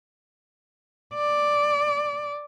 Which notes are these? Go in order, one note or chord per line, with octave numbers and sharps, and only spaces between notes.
D5